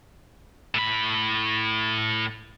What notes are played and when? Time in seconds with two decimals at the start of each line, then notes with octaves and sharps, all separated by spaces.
0.75 A2 B5